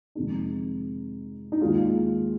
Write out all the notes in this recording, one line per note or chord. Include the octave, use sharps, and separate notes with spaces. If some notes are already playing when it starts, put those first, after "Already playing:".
F2 C3 D#3 G#3 D#4
D#4
D#2 D#3 G#3 F4